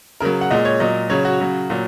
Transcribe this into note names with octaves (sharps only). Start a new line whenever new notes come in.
C#3 F#3 A#4
F#5
A#2 G#3 D#5
C#5
A#2 F#3 D#5
C#3 F#3 C#5
F#4
C#3 F#3
A#2 F#3